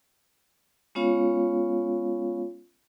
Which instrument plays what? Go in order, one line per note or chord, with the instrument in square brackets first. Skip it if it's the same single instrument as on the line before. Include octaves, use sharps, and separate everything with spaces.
[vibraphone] G#3 B3 C#4 F4 C#5 F5